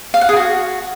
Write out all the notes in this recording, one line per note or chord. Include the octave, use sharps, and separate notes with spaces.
F5
F#5
G#4
F#4